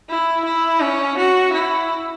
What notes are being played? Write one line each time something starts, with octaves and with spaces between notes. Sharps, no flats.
E4
E4
C#4
F#4
E4